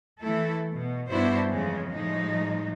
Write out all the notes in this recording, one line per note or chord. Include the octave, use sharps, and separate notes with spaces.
E3 A3 E4 A4
B2
G2 B3 D4 E4 F#4 C5
F2 C#3 E3 G#3
A2 F3 G3 G#3 D#4